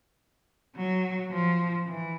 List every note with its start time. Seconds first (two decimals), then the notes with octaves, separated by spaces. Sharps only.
0.76 F#3
1.31 F3
1.86 E3